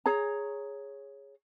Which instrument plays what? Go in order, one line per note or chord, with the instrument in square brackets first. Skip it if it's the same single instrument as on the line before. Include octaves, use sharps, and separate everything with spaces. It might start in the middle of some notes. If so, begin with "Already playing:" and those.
[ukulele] G#4 C#5 A#5